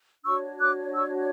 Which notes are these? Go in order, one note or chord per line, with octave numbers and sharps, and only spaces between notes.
D4 F#4 C#5 C#6 E6
D6 F#6
C#6 E6